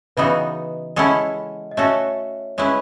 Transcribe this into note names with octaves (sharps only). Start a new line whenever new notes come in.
C#3 E3 B3 D#4 F#4 B4 D#5
G#3 C#4 E4 A4 D#5 F#5
D#5
A3 C#4 F#4 A4 C#5 E5
G#3 C#4 E4 B4 C#5